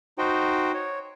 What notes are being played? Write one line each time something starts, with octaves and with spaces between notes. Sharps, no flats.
D#4 F#4 C5 G5
C#5